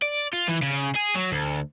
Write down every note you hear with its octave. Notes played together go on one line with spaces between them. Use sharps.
D5
F4
E3
C#3
G#4
F#3
D2